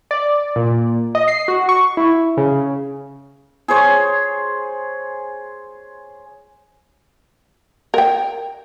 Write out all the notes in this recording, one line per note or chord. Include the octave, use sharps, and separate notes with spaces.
D5
A#2
D#5
C7
F#4
C#6
E4
C#3
G#4 C5 C#5
A#4 G5